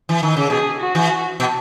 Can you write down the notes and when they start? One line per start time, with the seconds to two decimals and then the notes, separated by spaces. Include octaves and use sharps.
0.09 E3
0.23 D#3
0.36 C#3
0.50 B2 G#4
0.80 F#4
0.95 E3
1.40 B2